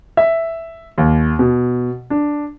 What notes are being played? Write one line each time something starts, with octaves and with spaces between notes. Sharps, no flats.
E5
D#2
B2
D4